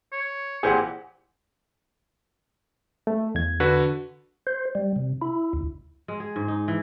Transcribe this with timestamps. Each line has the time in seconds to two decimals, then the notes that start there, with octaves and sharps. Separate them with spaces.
0.12 C#5
0.63 A#2 E3 G4 G#4 C5 F#5
3.07 A3
3.35 E2 G#6
3.60 D3 F#4 B4
4.47 C5
4.75 G3
4.96 C3
5.21 E4
5.53 D2
6.08 G#3
6.20 G#4
6.36 G#2
6.48 D#4
6.68 E3